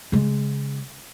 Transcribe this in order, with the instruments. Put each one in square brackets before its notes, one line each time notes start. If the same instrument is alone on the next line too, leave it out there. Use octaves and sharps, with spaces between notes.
[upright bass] C#3 G#3